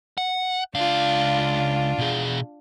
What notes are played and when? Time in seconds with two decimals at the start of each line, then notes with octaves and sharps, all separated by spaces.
0.18 F#5
0.75 C#2 D4 F4 F5
1.98 B2 G#4